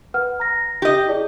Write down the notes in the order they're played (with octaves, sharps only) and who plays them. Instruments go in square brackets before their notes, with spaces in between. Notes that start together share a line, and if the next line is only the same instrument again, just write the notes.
[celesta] B4 F#5 F6
A#5 A#6
[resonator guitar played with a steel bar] G4 D#5
[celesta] E4 G#4 D5